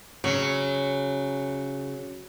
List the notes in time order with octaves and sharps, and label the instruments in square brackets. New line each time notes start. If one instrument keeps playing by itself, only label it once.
[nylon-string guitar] C#3 [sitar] F#3